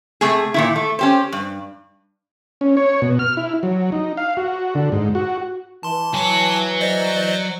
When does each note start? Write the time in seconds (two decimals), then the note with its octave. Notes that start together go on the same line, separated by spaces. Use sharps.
0.21 C3 A3 G#4
0.54 A#2 D#3 E4
0.76 A3
0.99 C#4 G4 C5
1.32 G2
2.61 C#4
2.77 C#5
3.02 B2
3.19 F6
3.37 E4
3.63 F#3
3.92 D#4
4.17 F5
4.37 F#4
4.75 D3
4.92 G#2
5.15 F#4
5.83 E3 A5 C6
6.14 F#3 C#5 G#5 A5
6.81 C5 D5 D#5